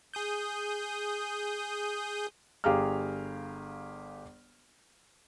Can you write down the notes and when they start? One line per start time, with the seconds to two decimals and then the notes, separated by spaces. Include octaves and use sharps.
0.14 G#4 D#6 G6
2.64 G1 G4 G#4 F5 A#5 F6